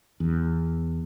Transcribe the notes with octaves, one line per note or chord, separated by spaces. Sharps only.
E2